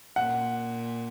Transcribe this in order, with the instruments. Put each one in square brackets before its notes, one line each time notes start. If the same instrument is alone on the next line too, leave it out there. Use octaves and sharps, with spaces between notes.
[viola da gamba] A#2 [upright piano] F#5